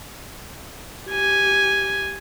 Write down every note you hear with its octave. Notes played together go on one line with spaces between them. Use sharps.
G4 G#5